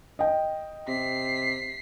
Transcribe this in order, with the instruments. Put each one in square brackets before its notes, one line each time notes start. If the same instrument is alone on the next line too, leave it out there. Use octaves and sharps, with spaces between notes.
[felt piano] D#5 G5
[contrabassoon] C3 [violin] B6 C7